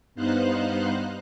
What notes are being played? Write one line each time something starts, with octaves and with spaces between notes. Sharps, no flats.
G2 B3 D#4 C5 F5 F#6